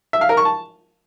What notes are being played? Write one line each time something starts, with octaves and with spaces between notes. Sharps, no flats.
E5
F5
A#4
C#6
A5